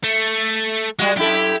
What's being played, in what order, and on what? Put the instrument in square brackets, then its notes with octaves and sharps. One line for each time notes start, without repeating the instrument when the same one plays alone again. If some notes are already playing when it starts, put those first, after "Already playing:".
[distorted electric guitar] A3
[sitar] G3 F#4 [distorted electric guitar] G#3
[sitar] F#2 E4 A4 [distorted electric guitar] G4